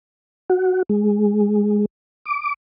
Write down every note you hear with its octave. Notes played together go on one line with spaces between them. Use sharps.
F#4
G#3
D6